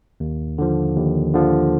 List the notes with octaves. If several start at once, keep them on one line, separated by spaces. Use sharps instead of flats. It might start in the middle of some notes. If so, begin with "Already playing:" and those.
D#2
D3 F3
D#2
D3 F3